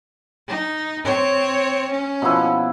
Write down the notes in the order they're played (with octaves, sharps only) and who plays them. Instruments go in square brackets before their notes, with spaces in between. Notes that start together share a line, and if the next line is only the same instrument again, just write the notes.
[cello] D#4
C4 C#5
C#4
[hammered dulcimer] B2 F3 E4